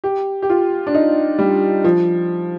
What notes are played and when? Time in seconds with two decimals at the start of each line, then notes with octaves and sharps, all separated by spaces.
0.04 G4
0.42 G4
0.50 F4
0.87 D4
0.94 D#4
1.39 G3
1.84 F3